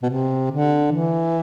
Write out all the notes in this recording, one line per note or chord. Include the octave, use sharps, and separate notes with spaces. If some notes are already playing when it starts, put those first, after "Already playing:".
B2
C3
D3
E3